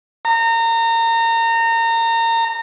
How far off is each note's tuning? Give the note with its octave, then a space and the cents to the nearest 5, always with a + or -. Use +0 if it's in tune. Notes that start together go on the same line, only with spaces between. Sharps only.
A#5 -30